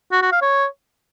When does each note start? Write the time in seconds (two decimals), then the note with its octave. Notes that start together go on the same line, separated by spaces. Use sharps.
0.12 F#4
0.22 F#4
0.32 F5
0.42 C#5